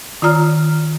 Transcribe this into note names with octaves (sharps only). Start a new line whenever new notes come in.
D#3 F4 D5 A#5 F6